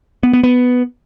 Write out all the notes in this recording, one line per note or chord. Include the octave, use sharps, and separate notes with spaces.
B3
B3
B3